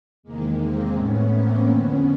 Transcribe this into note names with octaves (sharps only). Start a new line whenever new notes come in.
E2 C3 D#3 G#3 A#3
A#3 C4
A2 E3 B3 C#4
A#3 C4
F2 D3 B3 C#4